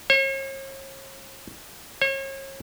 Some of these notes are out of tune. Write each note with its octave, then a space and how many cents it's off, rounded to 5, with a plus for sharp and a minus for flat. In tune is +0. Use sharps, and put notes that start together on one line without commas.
C#5 -45
C#5 -40